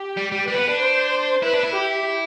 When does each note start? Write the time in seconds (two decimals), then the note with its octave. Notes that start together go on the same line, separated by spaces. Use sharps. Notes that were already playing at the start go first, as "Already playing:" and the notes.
Already playing: G4
0.17 G3
0.32 G3
0.48 G3 B4
0.54 C4
0.58 B3
0.69 D4
0.80 C5
1.43 E4 B4
1.53 D4
1.63 E4
1.74 G4